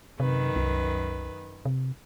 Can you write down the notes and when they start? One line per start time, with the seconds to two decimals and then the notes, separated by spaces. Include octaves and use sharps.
0.20 F#2 C3 D#3 B4
0.56 C2
1.65 C3